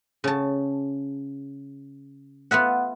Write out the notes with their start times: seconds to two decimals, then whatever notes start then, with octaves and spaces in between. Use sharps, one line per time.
0.24 C#3 A5
2.51 B3 F4 E5 F#5